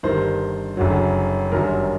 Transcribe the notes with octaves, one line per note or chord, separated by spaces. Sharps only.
G1 G2 D#3 C5
F#1 F#2 D3 F#3
G1 F#2 D#3 F#3 A#4